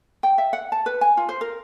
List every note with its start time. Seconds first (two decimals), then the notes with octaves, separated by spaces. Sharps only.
0.23 G5
0.38 E5
0.53 F#5
0.72 A5
0.86 B4
1.01 G#5
1.17 F4
1.29 C5
1.41 A#4